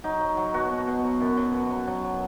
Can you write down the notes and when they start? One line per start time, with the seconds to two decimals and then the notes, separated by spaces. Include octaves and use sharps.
0.04 F#3 D#4
0.21 F#3
0.37 F#3
0.54 B2 F#4
0.70 B2
0.87 B2
1.04 F#3
1.21 F#2
1.37 F#3
1.54 B2
1.71 F#3
1.87 F#3
2.04 F#3